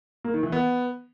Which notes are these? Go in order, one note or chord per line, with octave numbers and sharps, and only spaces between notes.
A#3
D#3
E3
B3